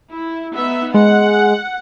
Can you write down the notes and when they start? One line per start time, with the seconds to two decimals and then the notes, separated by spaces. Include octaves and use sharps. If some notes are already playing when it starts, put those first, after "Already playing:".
0.10 E4
0.53 B3 D#4 E5
0.94 G#3 F#5